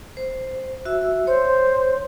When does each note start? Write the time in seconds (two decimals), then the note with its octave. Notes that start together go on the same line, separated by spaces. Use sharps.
0.17 C5
0.85 F#4 E5 E6
1.27 C5 C#5 C6